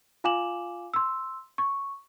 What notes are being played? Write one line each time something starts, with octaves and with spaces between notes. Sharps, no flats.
F4 F5 G#5 D6 E7 F#7
C6 E6
C#6